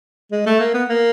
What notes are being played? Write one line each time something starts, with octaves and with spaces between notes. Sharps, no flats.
G#3
A3
A#3
B3
A#3